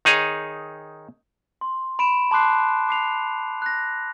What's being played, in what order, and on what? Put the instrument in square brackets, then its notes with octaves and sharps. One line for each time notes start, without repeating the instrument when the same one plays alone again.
[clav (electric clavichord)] D#3 D#4 G#4 C#5
[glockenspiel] C6
B5 D7 E7
A5 C6 D6 F#6 C7
D6 C7 F7
F#6 A#6